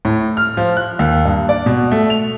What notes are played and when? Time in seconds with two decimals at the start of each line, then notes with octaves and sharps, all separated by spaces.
0.05 A2
0.37 F6
0.57 F3
0.77 F#6
0.99 D#2
1.25 G2
1.49 D5
1.66 B2
1.91 A3
2.10 F7